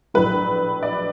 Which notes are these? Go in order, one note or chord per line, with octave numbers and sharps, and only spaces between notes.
A#1 A2 F#3 B4
D5